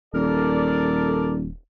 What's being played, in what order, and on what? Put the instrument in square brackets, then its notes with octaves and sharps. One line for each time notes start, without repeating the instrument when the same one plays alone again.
[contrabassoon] D#1 [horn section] A4 A#4 D5